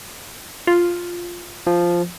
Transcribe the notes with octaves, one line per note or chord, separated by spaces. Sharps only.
F4
F3